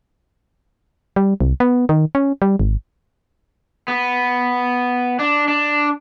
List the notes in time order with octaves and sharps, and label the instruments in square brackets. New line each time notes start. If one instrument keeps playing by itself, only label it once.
[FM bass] G3
C2
B3
D#3
C#4
G3
G#1
[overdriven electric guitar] B3
D4
D4